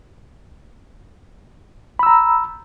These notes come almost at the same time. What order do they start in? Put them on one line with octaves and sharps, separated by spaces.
B5 E6 A#5